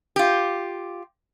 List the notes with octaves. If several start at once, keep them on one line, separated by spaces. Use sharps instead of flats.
F4 G4